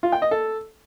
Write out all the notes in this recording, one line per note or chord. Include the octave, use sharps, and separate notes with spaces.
F4
G5
D#5
A4